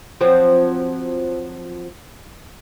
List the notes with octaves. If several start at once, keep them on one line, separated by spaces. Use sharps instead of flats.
F3 F#3 C4